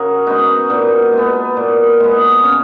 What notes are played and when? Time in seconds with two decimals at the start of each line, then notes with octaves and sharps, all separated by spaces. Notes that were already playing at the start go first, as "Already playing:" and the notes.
Already playing: C#3 F#4 G#4 A#4
0.26 G#3 B3 D#4 F#4
0.70 A#2 B3 D#4
1.13 G#3 B3
1.57 A#2
2.00 G#3 B3
2.43 C#3 C#4